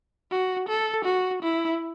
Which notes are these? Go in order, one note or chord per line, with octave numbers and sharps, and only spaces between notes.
F#4
A4
F#4
E4